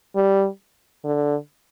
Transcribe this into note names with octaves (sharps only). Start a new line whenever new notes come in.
G3
D3